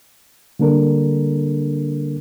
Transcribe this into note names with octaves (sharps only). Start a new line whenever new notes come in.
D3 G3 A#3 D4 A4 A#4